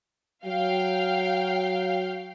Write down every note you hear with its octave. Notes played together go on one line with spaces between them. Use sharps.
F#3 F5 G5